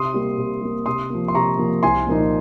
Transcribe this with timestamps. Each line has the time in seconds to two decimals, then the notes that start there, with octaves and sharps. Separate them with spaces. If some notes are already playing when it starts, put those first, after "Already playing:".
Already playing: C3 C6 D#6
0.14 G3 A#3
0.38 C3
0.62 G3 A#3
0.86 C3 C6 D#6
1.10 F3 A#3
1.28 C6
1.35 C3 A#5 C#6
1.59 F3 A#3
1.83 C2 G#5 C6
2.07 A#2 F3 A#3 D#4